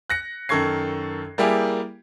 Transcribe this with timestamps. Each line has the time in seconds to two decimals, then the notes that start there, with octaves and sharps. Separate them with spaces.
0.10 F#6 A#6 C#7
0.49 F#2 D#3 A4 C#6 G#6 C7
1.38 G3 A#3 E4 G4 G#4